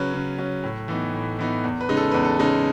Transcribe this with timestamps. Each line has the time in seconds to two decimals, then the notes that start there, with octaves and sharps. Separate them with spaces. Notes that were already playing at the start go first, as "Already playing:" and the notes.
Already playing: C#3 F#3 C#4 B4
0.14 C#3
0.38 F#3 C#4
0.64 A2
0.88 E3 B3 D#4
1.14 A2
1.39 E3 B3 D#4
1.64 E2
1.81 B4
1.89 C#3 G#3 D#4
1.97 A4
2.12 E2 B4
2.25 A4
2.39 C#3 G#3 D#4